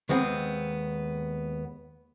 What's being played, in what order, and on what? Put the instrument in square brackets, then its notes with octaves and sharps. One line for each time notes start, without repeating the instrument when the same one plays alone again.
[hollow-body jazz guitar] D#2 G#3 B3 C4